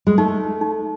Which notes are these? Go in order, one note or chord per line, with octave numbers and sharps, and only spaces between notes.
G#3
A3 D#4
D#4